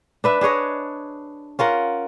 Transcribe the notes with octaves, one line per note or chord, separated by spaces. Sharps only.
D4 B4 E5
D4 G#4 C#5 D#5
C#4 F4 A#4 F#5